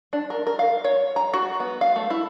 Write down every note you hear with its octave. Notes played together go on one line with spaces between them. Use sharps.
D4
A#4
A#4
F5
C#5
A#5
F#4
B3
F5
A3
E4